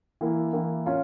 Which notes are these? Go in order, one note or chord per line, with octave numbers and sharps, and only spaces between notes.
E3 A#3 E4
E3 A#3 E4
C#4 F4